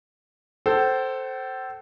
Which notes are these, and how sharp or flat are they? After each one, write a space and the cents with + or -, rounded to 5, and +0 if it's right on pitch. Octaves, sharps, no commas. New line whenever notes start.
A4 +0 C5 +0 G5 -45